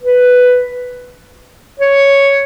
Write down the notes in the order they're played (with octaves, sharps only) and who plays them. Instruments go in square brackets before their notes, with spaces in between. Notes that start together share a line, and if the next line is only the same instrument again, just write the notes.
[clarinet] B4
C#5